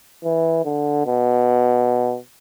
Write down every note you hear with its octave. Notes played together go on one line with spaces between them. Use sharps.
E3
D3
B2